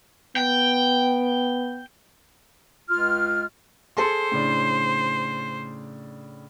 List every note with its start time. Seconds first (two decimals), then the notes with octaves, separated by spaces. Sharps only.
0.36 B3 G5
2.90 C#2 F4 F6
3.97 G#4 A4 C5 C6
4.32 A2 C#3 D4